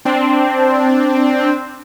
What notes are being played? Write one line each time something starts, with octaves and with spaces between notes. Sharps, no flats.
C4 D4